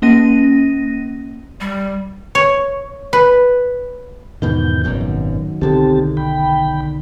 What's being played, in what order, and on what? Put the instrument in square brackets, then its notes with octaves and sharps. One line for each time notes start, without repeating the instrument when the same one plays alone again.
[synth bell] A#3 C#4 A#6 D#7
[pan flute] G3
[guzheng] C#5
B4
[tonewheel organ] E2 G6 [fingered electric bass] G#2 B2 D#3
[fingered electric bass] G#1 F#2 B2
[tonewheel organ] D#3 F#3
[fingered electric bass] B1 D3 D#3 [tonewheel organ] C4 G4 A5
[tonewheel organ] G5 B5